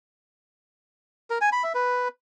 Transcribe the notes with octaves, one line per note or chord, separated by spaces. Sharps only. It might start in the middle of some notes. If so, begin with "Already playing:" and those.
A#4
G#5
B5
E5
B4